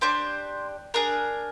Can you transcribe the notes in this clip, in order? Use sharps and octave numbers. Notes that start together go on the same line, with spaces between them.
D4 G4 C5
D4 G#4 A#4